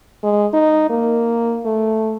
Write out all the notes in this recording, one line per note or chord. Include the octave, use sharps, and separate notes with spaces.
G#3
D#4
A#3
A3